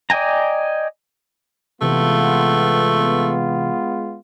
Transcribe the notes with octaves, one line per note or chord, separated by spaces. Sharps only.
D5 D#5 G5 G#5 A#5
C3 E3 G#3 A3 B3 F4